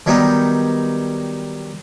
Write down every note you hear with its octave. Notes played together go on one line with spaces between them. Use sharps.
D#3 F#3 G3 B3 D#4